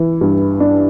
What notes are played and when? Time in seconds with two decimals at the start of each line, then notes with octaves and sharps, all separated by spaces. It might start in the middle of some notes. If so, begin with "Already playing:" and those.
Already playing: E3
0.21 G2
0.60 D4